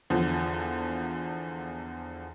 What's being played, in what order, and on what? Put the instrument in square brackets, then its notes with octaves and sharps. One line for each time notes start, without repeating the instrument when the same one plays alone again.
[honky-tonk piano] E2 D3 F3